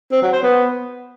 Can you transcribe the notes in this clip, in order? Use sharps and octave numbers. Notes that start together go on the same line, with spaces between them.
C4
F#3
C5
B3